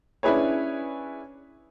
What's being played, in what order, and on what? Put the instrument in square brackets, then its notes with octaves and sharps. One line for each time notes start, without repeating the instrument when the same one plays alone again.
[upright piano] C#4 D4 E4 G#4 B4 C#5